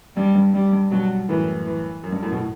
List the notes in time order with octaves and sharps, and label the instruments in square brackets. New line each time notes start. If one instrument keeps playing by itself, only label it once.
[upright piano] G2 [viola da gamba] G3
[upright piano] G2
[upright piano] G2 [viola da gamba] G3
[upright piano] G2
[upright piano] G2 B2 [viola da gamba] F#3
[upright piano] F#2 A2 [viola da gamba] E3
[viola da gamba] E3
[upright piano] F#2
G2
F#2 A2
B2
A2